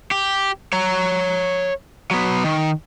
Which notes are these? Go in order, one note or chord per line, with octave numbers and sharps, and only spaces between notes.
G4
C#5 A#5
F#3 B3
D#3